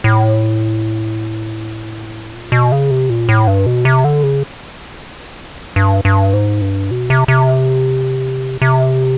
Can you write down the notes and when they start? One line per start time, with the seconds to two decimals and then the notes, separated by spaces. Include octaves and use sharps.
0.04 A2
2.33 A#2
2.52 B2
2.72 C#3
2.91 C3
3.10 A#2
3.29 A2
3.47 G2
3.66 B2
3.85 C3
4.04 D3
4.23 C#3
5.76 G2
6.05 G2
6.33 G#2
6.62 G2
6.91 B2
7.10 C3
7.28 C3
8.62 C3